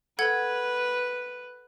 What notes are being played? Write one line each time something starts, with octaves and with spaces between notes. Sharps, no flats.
A4 B4 F#5 G#6